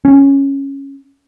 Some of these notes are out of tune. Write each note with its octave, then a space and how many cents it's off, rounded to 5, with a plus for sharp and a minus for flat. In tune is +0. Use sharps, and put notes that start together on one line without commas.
C#4 -5